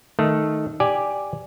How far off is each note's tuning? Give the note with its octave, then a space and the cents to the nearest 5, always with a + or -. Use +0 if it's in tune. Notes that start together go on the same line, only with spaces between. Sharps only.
D#3 +0 A3 -5
G4 +5 D5 +0 G#5 +0